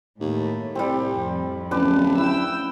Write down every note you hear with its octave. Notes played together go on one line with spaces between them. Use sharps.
D#2 A2
C2 G3 C4
F2 F3
D1 C#4 B4 D5 A5
E4 G5 E6